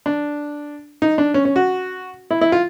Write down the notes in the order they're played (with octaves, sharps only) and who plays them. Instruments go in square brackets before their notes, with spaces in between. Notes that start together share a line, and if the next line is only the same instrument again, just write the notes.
[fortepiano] D4
D#4
D4
C#4
C#4
F#4
E4
E4
F4